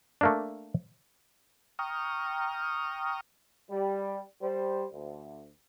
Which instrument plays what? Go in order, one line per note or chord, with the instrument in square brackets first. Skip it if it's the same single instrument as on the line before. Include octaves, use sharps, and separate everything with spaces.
[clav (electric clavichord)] A3 A#3 D4
[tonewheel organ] G5 A#5 C#6 D#6 F6
[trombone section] G3
G3 C5
D2